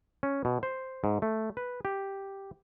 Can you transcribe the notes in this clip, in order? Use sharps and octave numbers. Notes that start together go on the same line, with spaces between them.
C#4
B2
C5
G#2
A3
B4
G4